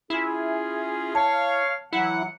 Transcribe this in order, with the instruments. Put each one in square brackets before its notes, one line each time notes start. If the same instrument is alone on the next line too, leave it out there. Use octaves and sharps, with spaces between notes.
[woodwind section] C#4 F4 G#4 [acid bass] E4
[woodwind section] C#5 F5 [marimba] A5
[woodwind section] E3 F#3 F#5 [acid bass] E4